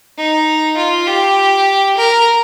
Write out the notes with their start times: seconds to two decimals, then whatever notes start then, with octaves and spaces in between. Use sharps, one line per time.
0.18 D#4
0.77 F4
1.07 G4
1.97 A#4